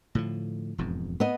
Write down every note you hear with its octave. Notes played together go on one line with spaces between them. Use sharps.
A2 D3 F3
E1 F2 G#2
B3 D#5